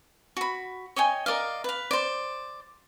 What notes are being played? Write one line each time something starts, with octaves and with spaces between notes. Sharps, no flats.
F#4 B5
C#5 D#5 G5 G#5
A#4 D5 D#5 F5
B4 F5
C5 D5